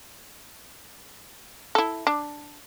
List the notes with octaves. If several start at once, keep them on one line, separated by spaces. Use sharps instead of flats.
E4 A4
D4